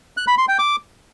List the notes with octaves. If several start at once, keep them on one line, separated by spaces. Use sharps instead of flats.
F#6
B5
C6
G5
D6